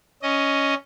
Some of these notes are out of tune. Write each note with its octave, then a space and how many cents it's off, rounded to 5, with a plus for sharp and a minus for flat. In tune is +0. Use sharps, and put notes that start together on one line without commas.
C#4 +5 D#5 +0